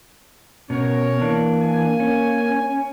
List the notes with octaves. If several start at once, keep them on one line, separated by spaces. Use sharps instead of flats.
B2 C#4 A#4 C#5
E3 A#3 D4
G#5
C#4